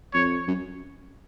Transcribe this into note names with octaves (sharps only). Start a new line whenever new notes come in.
F2 C#5
F#2